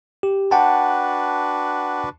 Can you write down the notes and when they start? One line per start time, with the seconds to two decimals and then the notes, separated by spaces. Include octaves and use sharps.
0.23 G4
0.51 D4 F#4 B4 F#5 G5 A5